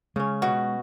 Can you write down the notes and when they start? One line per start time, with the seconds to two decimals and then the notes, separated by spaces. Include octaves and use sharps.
0.16 C#3 G#3 C#4
0.42 B2 F#4